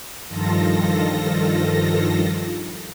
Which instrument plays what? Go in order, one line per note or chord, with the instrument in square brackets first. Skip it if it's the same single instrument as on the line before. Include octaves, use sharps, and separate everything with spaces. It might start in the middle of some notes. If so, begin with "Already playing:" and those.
[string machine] G2 D#3 F3 F4 A4 A#6